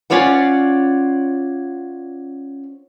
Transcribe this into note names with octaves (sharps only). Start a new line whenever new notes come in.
C#4 F4 C#5 D5 F#5